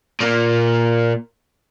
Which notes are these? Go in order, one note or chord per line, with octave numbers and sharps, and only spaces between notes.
A#2 A#3